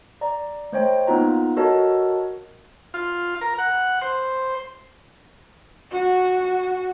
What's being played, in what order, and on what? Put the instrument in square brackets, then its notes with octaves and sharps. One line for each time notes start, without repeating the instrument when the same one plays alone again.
[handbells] D5 A#5
A3 C5 C#5 D#5 G5
A#3 B3 D#4 F4 A#5
F#4 A4 A#4 C#5 D#5 A5
[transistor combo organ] F4
A#4
F#5
C5
[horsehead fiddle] F#4